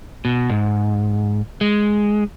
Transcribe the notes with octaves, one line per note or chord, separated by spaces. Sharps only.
B2
G#2
G#3